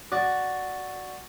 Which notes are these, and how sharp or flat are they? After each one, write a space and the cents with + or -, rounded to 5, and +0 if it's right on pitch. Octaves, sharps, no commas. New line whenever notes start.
F#4 +0 D5 +0